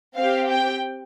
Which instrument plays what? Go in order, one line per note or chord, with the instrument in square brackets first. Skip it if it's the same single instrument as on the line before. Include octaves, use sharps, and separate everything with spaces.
[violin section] C4 G4 F5
G5